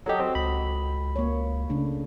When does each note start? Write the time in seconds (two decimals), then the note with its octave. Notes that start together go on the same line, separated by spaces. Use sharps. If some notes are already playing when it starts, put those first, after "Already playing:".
0.06 F#3 F#4 G4 A4 D#5
0.20 C4
0.35 C#2 B5
1.16 A#3 C#5
1.70 C#3 A3 D4